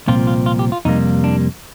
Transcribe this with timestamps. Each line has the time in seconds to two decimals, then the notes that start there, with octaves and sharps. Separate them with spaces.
0.08 C2 A#2 F3 C4 F4
0.27 F4
0.46 F4
0.59 G4
0.72 F4
0.85 F2 C3 G3 A#3 D#4
1.24 D4